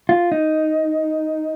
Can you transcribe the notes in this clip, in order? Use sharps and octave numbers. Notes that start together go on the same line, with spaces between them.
F4
D#4